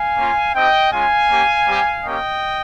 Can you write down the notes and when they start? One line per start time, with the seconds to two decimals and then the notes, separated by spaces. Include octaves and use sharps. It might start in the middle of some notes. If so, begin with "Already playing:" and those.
Already playing: F5 G#5
0.18 A#3 C#4 F4
0.54 C4 D#4 G4 D#5 G5
0.91 G#3 C#4 F4 F5 G#5
1.29 A#3 C#4 G4
1.67 G3 C4 G4
2.03 A#3 C#4 G4 D#5 G5